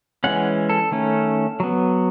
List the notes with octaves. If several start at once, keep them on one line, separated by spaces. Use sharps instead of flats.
E3 G#3 C#4 F#5
A4
D#3 A3 C#4
F#3 B3